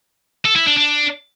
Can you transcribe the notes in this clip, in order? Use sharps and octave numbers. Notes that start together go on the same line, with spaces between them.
A4
E4
D4
D4